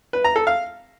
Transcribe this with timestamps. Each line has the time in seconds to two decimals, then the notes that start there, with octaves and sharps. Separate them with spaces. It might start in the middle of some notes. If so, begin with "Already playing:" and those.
0.13 B4
0.24 A#5
0.36 A4
0.47 F5